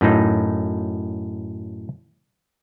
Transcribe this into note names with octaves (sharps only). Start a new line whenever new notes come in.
F#2 A2 D#4